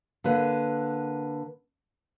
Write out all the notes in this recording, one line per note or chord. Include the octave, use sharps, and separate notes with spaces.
D3 A#3 B4 C#5